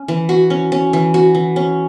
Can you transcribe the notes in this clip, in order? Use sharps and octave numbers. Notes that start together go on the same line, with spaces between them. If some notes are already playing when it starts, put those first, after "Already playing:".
Already playing: C#4
E3
F#4
C#4
C#4
E3
F#4
E3
C#4